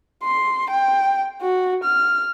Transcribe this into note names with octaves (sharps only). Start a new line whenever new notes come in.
C6
G5
F#4
F6